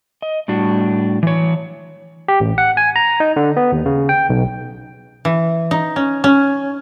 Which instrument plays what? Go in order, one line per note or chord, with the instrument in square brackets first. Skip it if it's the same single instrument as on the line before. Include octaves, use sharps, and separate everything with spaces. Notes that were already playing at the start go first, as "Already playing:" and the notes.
[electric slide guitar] D#5
A2 G3 D4 F#4
E3 C#5
[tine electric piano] G4
A1
F#5
G#5
A#5
D#4
D3
B3
D#2
C#3
G5
B1
[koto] E3
D#4
C#4
C#4